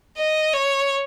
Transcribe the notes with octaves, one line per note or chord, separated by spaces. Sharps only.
D#5
C#5